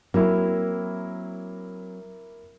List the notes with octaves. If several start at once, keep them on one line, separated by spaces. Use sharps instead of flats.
F#3 A#3 C4 E4